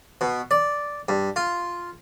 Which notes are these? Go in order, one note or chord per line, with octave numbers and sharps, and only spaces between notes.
B2
D5
G2
F4